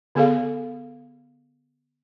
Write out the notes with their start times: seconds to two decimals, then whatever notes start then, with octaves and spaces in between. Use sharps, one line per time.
0.15 D3 B3 G#4 A4 F5